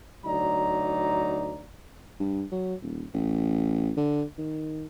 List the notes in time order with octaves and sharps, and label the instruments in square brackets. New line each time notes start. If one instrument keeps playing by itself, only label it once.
[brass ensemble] D2 F#3 D#4 D5 A#5
[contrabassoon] G2
F#3
D#1
A1
D3
D#3